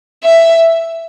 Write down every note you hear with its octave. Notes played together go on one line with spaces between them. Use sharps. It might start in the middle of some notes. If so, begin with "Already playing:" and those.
E5